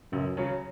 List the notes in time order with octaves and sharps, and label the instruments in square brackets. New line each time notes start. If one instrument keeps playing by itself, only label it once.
[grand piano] C#2 [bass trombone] F#2
[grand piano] C#3 F#3 C#4